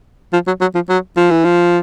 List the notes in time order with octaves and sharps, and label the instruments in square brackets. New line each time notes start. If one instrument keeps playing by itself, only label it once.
[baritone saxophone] F3
F#3
F#3
F3
F#3
F3
E3
F3